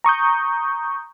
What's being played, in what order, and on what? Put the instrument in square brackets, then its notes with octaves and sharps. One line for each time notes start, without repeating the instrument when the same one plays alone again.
[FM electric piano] A#5 C#6 D#6 G6